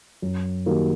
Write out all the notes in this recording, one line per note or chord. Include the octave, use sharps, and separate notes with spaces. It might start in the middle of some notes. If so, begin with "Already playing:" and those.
F#2
D#3 G3 A#3 F#4